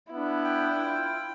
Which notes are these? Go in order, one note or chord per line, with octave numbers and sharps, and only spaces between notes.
B3 D4 E4
G5
F4